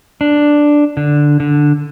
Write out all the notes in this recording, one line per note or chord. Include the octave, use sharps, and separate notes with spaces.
D4
D3
D3